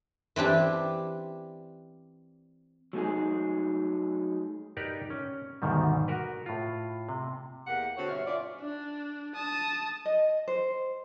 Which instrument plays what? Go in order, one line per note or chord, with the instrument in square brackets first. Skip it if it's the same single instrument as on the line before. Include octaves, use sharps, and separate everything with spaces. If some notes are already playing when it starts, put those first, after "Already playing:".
[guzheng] E3 C4 D4 G4
[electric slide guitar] F#3 A3 D#4 G#4
[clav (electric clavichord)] D#4 G4 A#4 B4 D5
C#4
D2 G#2 B2 D#3 G3
F#4 A#4 B4
A2 F4
C3
[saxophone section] E2 A#3 G4 F#5
D3 C4 F#4 C5 C#5
G2 B2 C#5 E5 F5
C#4 E4 F4 D5
[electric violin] D4
A5 D#6
[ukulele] D#5
C5